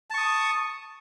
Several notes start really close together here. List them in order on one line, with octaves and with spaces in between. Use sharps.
A5 C#6 D#6